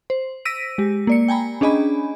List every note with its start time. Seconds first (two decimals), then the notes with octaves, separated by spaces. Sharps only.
0.10 C5
0.45 E6 A#6 B6 D7 D#7
0.78 G#3 G4
1.07 A#3 D5 C#7
1.28 G5 G#5 A#5 B5
1.61 C#4 D4 G#4 D#5 G#5 B5